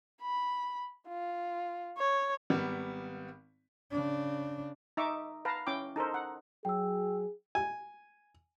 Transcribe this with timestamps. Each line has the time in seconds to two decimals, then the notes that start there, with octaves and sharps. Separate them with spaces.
0.21 B5
1.08 F4
1.98 C#5
2.50 G#1 G3 B3
3.92 C#3 D4
4.97 D#4 E5 C#6 D6
5.45 B4 F5 A5 A#5
5.67 C#4 E4 G5 D6
5.96 D#4 A4 A#4 C5
6.14 F#5
6.65 F#3 G#4 G5 E6
7.55 G#5